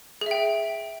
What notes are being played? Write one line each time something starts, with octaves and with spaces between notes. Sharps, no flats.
G#4 E5 G5